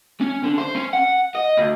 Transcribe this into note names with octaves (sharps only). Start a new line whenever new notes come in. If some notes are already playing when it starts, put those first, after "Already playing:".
C#4
D3
C5
C#4
F#5
D#5
D2